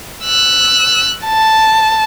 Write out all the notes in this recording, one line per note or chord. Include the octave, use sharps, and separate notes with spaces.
E6 F#6
A5